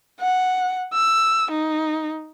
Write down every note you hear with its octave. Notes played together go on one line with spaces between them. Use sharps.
F#5
E6
D#4